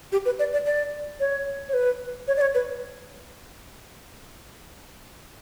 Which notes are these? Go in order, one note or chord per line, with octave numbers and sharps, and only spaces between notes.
G4
B4
D5
D5
D5
C#5
C#5
B4
C#5
D5
C#5
B4